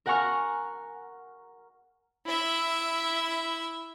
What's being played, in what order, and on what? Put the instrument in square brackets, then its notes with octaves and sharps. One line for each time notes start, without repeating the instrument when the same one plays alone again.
[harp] A#4 F#5 G#5 A#5 C#6 F6
[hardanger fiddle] E4 E5